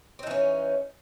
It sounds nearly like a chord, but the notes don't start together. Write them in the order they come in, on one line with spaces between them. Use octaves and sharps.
C4 D#4 E3 C#4